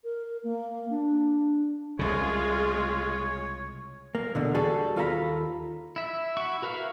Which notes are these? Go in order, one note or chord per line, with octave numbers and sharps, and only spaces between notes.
A#4
A#3
D4
C2 C#3 G#3 F4 G#4 C#5
A#3
E2 B2 D3
G3 F#4 G#4 A4
D#2 F4 A4 F5 A#5 B5
E4 E5
E4 F#4 C#6
F#4 A#4 B4 E5 F5